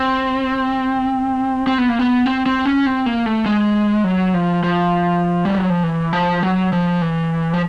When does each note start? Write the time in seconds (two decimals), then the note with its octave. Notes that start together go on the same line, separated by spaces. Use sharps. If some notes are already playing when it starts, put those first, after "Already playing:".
Already playing: C4
1.67 C4
1.78 B3
1.89 A#3
1.99 B3
2.26 C4
2.46 C4
2.66 C#4
2.86 C4
3.06 A#3
3.26 A3
3.46 G#3
4.04 F#3
4.34 F3
4.63 F3
5.45 G3
5.58 F#3
5.70 F3
5.83 E3
6.13 F3
6.43 F#3
6.73 F3
7.02 E3
7.54 F3